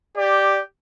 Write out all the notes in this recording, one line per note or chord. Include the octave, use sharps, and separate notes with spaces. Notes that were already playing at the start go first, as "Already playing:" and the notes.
G4 D5